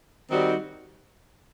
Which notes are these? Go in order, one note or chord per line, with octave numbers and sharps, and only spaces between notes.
D#3 G3 C4 D#4 F#4